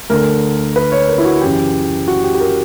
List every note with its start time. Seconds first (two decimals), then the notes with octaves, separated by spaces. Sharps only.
0.10 D2 D3 A#4
0.76 B4
0.92 C#5
1.08 A#4
1.18 E4
1.25 F#4
1.41 F#2 C#3 E3 G4
2.08 F#4
2.23 G4
2.35 G4
2.40 A#4